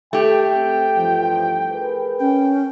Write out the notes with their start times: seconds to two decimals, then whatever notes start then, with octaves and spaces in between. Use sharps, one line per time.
0.13 A3 G4 G5
0.56 C4
0.97 G2 E3 F3
1.71 G#4 A#4 B4
2.20 C#4 G5